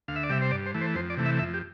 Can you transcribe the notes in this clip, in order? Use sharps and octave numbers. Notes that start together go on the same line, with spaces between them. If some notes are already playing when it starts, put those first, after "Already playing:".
D2 F5
E5
D5
C3 G3 E5
C5
G2 D5
C5
E3 A3
C5
F2 C5
D5
C3 E3 A3
E5
F2 E5
G4